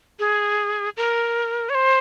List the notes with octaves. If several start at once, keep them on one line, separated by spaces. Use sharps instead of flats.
G#4
A#4
C#5
C5